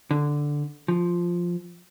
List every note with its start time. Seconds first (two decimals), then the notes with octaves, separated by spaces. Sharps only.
0.11 D3
0.88 F3